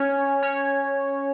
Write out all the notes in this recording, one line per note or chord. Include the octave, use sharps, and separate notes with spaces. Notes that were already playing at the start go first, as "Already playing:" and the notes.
Already playing: C#4 C#5
C#4 C#5